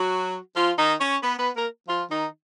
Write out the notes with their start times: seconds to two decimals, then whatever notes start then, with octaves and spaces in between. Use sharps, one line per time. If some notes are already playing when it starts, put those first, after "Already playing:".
Already playing: F#3 F#4
0.56 F3 F4
0.78 D#3 D#4
1.00 C#4 C#5
1.22 B3 B4
1.39 B3 B4
1.55 A#3 A#4
1.89 F3 F4
2.10 D#3 D#4